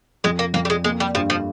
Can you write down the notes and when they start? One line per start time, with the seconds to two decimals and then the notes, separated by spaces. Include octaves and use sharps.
0.24 F2 G#3
0.39 A#3
0.54 F2 A#3
0.65 G3
0.70 G#3
0.84 G#3 A#3
1.00 G3
1.15 G2 F3
1.30 F3